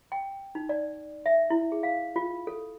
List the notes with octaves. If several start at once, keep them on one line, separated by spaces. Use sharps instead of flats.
G5
D#4
D5
E5
E4
G#4
F5
F4
A4